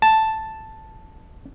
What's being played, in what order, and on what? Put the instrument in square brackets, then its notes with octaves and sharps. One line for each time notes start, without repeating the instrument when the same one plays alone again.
[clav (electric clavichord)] A5